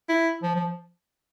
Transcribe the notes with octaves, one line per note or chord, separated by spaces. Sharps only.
E4
F3
F3